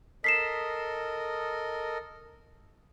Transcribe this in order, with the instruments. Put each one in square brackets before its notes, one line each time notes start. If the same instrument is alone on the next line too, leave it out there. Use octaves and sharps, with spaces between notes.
[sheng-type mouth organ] A4 A#4 D#5 [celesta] B6 C7 E7